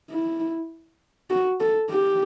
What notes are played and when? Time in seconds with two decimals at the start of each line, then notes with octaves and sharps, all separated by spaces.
0.10 E4
1.30 F#4
1.60 A4
1.90 G4